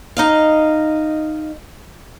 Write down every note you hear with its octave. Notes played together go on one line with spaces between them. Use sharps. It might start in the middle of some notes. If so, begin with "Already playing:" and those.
D#4 D#5 F5